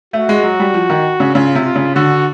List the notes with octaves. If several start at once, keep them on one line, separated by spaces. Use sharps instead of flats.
A3 F#4
G#3
F#3
G3
F3
D#3
C#3
C#3 F4
C3
F4
C#3
D3 F#4